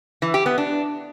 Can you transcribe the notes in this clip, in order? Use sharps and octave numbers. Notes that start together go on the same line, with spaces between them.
E3
G4
B3
D4